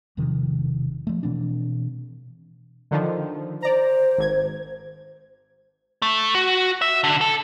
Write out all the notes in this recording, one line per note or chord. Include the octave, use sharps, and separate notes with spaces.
E1 C3 D#3 F3
F3 A3
B2 E3 C4 D4
D3 D#3 F3
C5 D5 A#5
G#1 G#6
A3
F#4
E5
D3
A4